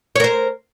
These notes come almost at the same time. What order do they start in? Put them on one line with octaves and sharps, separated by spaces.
C#5 A#4 C5